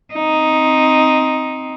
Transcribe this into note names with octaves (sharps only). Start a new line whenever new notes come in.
C4 D#4